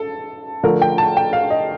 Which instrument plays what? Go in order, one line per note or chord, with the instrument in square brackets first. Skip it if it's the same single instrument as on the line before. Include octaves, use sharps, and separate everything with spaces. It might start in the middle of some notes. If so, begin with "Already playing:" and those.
Already playing: [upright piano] A4
D3 F3 A3 A#4
G5
A5
G5
F5
D#5